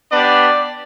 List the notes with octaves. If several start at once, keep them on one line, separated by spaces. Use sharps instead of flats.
B3 D4 G4 D5